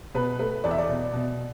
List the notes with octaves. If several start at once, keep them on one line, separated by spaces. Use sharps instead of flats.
B2 B4
A3 B4
E2 D5
E5
D5
B2
B2